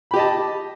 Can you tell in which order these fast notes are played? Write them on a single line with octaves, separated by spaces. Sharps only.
B5 G4 D#5 A5